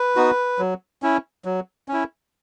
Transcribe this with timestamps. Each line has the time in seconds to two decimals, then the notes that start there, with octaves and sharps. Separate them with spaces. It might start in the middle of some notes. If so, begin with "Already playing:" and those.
Already playing: B4
0.16 B3 D#4 F#4
0.59 F#3
1.02 C#4 E4
1.45 F#3
1.88 C#4 E4